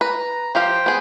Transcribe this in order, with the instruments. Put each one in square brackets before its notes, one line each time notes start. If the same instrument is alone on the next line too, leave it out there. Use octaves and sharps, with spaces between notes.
[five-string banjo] B4 [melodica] A#5
[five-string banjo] F3 G4 F5 [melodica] C5 G5
[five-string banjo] B3 G#4